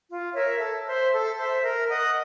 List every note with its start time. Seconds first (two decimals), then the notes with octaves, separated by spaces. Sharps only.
0.09 F4
0.34 A#4 C#5 E5
0.60 A4
0.86 C5 E5
1.12 A4
1.39 C5 E5
1.64 A#4
1.90 D#5 F#5